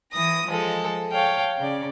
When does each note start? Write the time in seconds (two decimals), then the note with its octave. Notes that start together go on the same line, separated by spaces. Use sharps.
0.11 E3 D#6 A#6
0.47 F3 G#3 A4
1.12 C#5 F5 G5 A5
1.58 C#3 D5